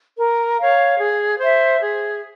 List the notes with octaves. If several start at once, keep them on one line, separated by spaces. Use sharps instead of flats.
A#4
C#5 F5
G#4
C5 E5
G#4